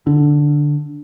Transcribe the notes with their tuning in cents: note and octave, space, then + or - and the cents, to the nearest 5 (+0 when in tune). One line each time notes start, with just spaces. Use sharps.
D3 +0 D4 +0